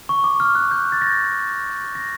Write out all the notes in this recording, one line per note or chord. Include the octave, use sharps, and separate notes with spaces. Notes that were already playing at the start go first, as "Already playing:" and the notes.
C#6
D6
F6
F#6
G6
A6
A#6
A#6